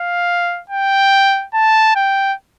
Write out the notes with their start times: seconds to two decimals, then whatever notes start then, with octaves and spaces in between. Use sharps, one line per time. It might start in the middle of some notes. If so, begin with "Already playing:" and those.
Already playing: F5
0.70 G5
1.54 A5
1.95 G5